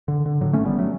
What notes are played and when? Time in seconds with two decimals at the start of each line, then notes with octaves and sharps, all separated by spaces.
0.08 D3
0.26 D3
0.41 A2 D3 F#3
0.53 A1 A3 C#4
0.65 G3 B3
0.78 F#3 A3